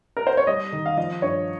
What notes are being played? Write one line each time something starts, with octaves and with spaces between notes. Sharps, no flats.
A#4
C5
C#5
G3 D#5
D#3
F5
F3 D#5
G2 C#5